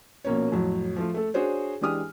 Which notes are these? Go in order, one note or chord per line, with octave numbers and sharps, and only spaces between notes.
A#1 B2 A#3 C#4 C#5
F2 A2 F#3
F3 A3 F4
A3 A4
D4 F#4 G#4 C5 C#5
E3 G#3 D4 G4 D#6 F6